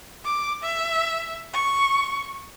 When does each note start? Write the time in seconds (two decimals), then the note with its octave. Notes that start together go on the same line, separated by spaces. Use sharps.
0.25 D6
0.63 E5
1.53 C#6